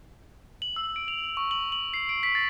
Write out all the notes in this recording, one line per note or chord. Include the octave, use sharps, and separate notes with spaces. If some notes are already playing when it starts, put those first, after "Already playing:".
F#7
E6
D7
F7
C#6
F#7
F#7
C7
D7
B6
A6